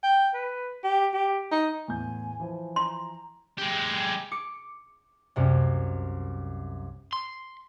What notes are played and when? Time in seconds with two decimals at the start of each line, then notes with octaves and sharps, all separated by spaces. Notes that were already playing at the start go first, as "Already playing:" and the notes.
0.03 G5
0.34 B4
0.84 G4
1.14 G4
1.51 D#4
1.88 E2 A2 G#5 G6
2.40 E3 F3
2.76 A#5 C6
3.58 G#3 G4
4.31 D6 C#7
5.36 C2 F#2 C3
7.13 C6